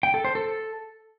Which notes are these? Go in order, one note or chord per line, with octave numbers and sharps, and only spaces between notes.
G5
A4
C5
A4